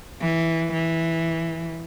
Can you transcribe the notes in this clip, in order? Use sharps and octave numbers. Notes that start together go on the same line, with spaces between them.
E3
E3